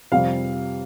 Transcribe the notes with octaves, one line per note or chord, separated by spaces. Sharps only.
F2 C3 G3 F5